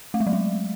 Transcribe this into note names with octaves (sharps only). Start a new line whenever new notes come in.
A3
G#3
F#3
G#3